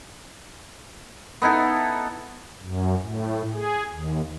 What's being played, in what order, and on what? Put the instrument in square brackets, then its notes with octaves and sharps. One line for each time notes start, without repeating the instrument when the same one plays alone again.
[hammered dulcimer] B3 D#4 E4 A4
[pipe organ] F#2
A2
G#4
D#2